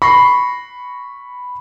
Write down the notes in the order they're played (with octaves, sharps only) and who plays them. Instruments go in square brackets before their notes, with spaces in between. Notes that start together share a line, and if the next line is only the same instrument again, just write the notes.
[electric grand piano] B5 [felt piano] C#6 A#6 C7